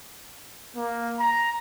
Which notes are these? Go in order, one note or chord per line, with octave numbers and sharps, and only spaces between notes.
A#3
A#5